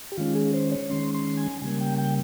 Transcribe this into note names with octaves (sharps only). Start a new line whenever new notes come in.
G4
D#3 G#3 C#4 F4
G#4
C5
C#5
D#3 G#3 C#4 C6
C6
G#5
C#3 G3 A#3 G#5
G5
G5